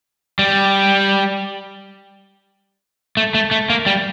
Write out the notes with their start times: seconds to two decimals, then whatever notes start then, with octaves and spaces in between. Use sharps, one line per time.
0.39 G3
3.17 A3
3.34 A3
3.51 A3
3.70 A#3
3.86 G3